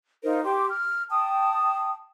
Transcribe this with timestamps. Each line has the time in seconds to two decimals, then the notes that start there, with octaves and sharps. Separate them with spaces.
0.23 D#4 F4 A#4 C5
0.43 G4 C6 D6
0.70 F6
1.10 G5 A5 D#6